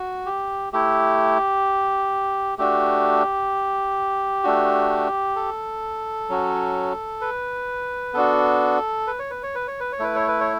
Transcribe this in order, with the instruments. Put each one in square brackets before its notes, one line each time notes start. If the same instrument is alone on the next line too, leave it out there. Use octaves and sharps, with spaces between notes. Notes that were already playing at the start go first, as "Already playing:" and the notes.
Already playing: [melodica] F#4
G4
A3 E4 G4
A3 D4 F#4 G4
A3 D4 F#4
A4
F#3 C#4 F#4
B4
B3 D4 F#4 A4
B4
C#5
B4
C#5
B4
C#5
B4
C#5
A3 E4 B4
C#5
B4
C#5